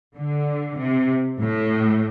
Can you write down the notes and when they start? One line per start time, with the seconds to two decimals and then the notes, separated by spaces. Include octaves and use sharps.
0.17 D3
0.79 C3
1.40 A2